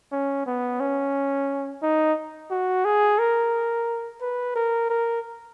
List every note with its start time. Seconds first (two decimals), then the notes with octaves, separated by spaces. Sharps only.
0.12 C#4
0.46 B3
0.80 C#4
1.82 D#4
2.51 F#4
2.85 G#4
3.19 A#4
4.21 B4
4.55 A#4
4.90 A#4